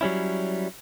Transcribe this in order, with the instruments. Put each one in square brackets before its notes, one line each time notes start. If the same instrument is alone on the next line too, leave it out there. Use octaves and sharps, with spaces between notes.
[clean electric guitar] F#3 G3 C#4 E4